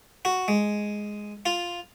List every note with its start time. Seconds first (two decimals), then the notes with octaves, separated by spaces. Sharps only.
0.25 F#4
0.48 G#3
1.46 F4